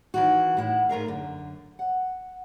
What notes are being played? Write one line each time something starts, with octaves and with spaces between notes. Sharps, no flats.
D#3 E3 F#4
A2 E4 F#5
G#2 A3 A#4 F5
F#2 D3
F#5